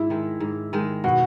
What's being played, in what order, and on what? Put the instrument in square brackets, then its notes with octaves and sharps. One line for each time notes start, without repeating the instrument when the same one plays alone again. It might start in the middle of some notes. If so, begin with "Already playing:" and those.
Already playing: [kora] G#2 [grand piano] E4
[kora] D#3 G#3
G#2
D#3 G#3
[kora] B2 [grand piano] F#4